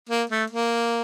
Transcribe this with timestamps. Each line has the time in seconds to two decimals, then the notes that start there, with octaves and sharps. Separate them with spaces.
0.09 A#3
0.30 A3
0.50 A#3